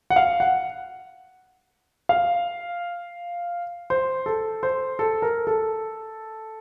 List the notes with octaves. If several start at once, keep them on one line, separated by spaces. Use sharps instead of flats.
F#5
F5
F#5
F5
C5
A4
C5
A4
A#4
A4